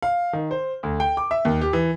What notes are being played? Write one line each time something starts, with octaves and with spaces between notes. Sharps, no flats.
F5
D#3
C5
D2
G5
D6
E5
D#2
G4
E3